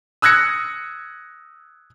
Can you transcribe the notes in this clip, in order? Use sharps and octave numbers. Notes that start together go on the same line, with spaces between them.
D#6 E6 F#6 G#6 A#6 C#7